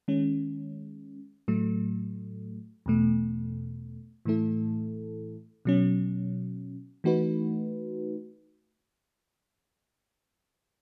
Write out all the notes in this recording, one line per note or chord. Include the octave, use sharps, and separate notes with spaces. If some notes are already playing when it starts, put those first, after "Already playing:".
D#3 G#3 C#4
A2 F#3 A3
E2 B2 A3
A2 E3 A3 E4 A4
B2 F#3 C#4
E3 A3 D#4 F#4 B4